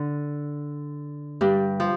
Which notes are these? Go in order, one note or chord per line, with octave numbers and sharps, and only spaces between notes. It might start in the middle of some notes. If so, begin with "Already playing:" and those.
Already playing: D3
G2 G3
F3